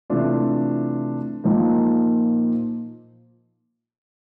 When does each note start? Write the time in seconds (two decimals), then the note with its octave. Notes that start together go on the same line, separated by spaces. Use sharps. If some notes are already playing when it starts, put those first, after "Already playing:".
0.10 C3 E3 A3 D4 F4
1.44 A#2 F3 A#3 D#4